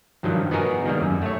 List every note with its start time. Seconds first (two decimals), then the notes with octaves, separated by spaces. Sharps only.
0.23 G2 D#3 F3 F#3
0.51 B3 D#4 F#4 G#4 A#4
0.85 D#3 G3 A#3
1.01 F#2
1.22 A3 C#5